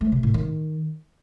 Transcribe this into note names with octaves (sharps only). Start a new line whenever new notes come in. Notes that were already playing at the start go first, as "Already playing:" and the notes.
A3
C3
A2
D#3